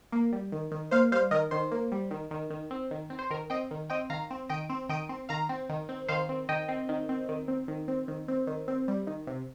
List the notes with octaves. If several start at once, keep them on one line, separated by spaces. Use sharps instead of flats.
A#3
G3
D#3
D#3
A#3 C5 F5
G3 C5 F5
D#3 A#4 D#5
D#3 C5
A#3
G3
D#3
D#3
D#3
C4
D#3
C4
C5
D#3 A#4
C4 D#5 G5
D#3
C4 D#5 G5
D#3 F5 A#5
C4
D#3 D#5 G5
C4
D#3 D#5 G5
C4
D#3 F5 A#5
C4
D#3
C4
D#3 C5 F5
C4
D#3 D#5 G5
C4
D#3
C4
D#3
C4
D#3
C4
D#3
C4
D#3
C4
G3
D#3
C3